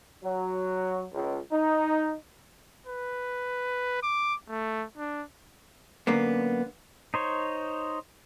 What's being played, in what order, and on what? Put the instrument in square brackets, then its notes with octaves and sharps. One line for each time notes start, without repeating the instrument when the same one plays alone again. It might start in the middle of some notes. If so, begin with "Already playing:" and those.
[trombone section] F#3
C#2
D#4
[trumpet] B4
D6
A3
D4
[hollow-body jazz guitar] F#2 D3 A#3 B3
[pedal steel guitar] D#4 C5 C#5